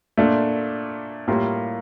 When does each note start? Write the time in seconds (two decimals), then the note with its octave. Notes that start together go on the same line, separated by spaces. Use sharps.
0.17 A#2 A3 D4 F4
1.28 A2 G3 A#3 F4 A#4